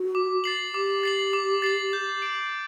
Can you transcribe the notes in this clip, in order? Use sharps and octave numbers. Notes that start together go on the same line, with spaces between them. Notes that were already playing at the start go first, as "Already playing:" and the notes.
Already playing: F#4
D6
A6 C7 F#7
G4 D6
A6 C7 F#7
D6
A6 C7 F#7
G6
D7 F#7